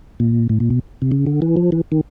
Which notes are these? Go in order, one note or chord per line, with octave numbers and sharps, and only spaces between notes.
A#2
A2
A#2
B2
C3
C#3
D3
E3
F3
E3
D#3